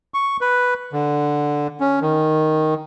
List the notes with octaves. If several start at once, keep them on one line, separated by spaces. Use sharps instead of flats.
C#6
B4
D3
C#4
D#3